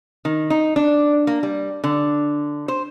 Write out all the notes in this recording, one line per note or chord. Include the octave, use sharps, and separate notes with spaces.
D#3
D#4
D4
A#3
G3
D3
C5